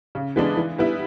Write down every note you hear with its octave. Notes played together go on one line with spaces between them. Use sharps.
C#3
E3 G#3 B3 D4
E3
G3 B3 E4